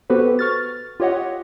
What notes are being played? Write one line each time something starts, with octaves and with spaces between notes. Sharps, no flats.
B3 F#4 G4 A4 B4 C5
C#6 F6 A6
F4 G4 C#5 D#5 F#5